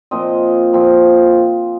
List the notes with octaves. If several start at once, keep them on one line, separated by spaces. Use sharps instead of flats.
A#2 F3 C4 D#5
A#2 F3 C4